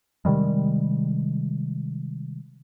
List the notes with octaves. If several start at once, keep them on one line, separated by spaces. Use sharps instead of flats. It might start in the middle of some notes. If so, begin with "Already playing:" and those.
C3 D#3 G3 G#3